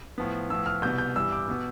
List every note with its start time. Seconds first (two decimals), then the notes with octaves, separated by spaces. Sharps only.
0.18 A2 F3 B3
0.50 A2 F3 B3 E6
0.66 F6
0.82 C2 B2 B3 G6
0.98 G6
1.16 G2 E3 G3 E6
1.32 D6
1.48 B2 B3